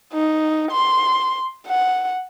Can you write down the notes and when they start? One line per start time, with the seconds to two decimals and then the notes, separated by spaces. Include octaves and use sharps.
0.13 D#4
0.71 C6
1.67 F#5